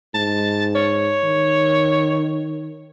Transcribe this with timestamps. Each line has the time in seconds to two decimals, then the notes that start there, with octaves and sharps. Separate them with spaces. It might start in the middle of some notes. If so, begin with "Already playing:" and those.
0.14 G#2 A5
0.76 C#5
1.24 D#3